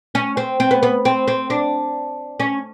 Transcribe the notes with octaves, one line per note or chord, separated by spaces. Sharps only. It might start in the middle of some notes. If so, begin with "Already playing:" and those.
C#4
C4
C4
B3
B3
C4
C4
D4
C#4